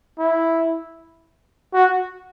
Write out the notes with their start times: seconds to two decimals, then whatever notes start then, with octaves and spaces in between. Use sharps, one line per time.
0.19 E4
1.74 F#4